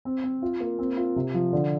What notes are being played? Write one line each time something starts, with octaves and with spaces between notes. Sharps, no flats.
C4
C4
F4
A#3
C4
F4
C3
F3
D3